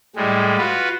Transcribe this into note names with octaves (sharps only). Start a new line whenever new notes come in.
A2 G3 G#3
F4 F#4 B4